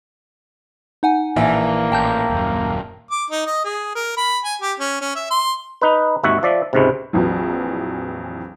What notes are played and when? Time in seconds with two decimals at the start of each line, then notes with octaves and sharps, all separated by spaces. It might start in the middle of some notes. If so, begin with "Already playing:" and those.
1.03 D#4 F#5 G#5
1.36 A#1 E3 A#3 E5
1.92 A1 G5 A5 G6
2.30 D#1 F#2
3.11 D6
3.31 D#4
3.47 D#5
3.65 G#4
3.96 A#4
4.17 B5
4.45 G#5
4.62 G4
4.80 C#4
5.01 C#4
5.16 E5
5.31 C6
5.82 D#4 B4
6.23 G#1 D#2 F#4 E5 F#5
6.43 F3 D5 E5
6.73 C#2 G#2 C3
7.13 A#1 F2 E3 F#3